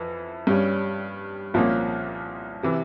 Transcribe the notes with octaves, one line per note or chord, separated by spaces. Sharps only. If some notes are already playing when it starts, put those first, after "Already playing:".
Already playing: F2 E3
G2 G3 C#4
C2 A#2 F3 A#3 C#4
C3 E3